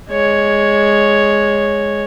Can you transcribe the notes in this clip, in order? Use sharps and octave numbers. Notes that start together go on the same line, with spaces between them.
G#3 C#5